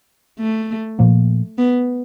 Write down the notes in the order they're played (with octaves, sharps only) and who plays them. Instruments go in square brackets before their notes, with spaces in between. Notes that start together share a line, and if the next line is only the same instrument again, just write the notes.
[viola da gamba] A3
[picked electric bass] A#2 F3 A#3
[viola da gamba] B3